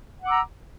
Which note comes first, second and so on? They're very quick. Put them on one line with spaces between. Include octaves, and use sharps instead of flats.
F#5 D6 E6 A#5